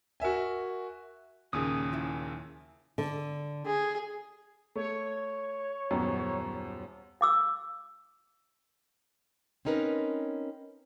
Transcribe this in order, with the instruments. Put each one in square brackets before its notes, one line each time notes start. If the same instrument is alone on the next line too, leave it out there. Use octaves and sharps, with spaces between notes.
[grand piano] F#4 A#4 E5 G#5
[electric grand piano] D#2 A#2 C#3 [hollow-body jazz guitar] C#4 G#4 [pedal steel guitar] E5 G#5 D#6
[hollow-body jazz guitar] F3 C#4 E4
[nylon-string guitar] D3
[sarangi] G#4
[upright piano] A3 [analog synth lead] C#5
[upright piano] D#1 F#2 B3
[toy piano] F5 D6 E6
[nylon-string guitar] C4 C#4 D#4 A#4 B4